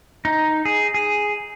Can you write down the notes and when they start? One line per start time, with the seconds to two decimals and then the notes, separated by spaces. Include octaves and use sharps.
0.25 D#4
0.65 G#4
0.94 G#4